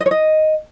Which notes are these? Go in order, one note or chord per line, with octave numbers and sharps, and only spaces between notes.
D#5
C#5
D#5